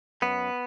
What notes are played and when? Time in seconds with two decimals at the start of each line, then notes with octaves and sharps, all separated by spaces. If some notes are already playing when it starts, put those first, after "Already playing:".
0.22 F#2 B3